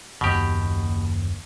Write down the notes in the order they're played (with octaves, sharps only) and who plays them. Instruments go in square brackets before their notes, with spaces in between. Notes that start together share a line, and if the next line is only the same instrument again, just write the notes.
[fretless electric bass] F#1 D#2 [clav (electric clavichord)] B2 G4